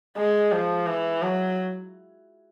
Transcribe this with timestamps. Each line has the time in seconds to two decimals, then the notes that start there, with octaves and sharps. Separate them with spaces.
0.17 G#3
0.52 F3
0.87 E3
1.22 F#3